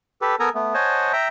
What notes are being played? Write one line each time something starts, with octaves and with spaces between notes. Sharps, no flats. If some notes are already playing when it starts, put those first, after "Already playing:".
G4 A4 B4
B3 A4 A#4 G#5 A#5
A3 B3
C5 C#5 D#5 F#5 G#5 A5
E5 G5 A#5